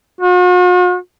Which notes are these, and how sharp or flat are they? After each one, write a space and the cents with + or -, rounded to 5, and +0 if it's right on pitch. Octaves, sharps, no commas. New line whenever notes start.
F#4 -45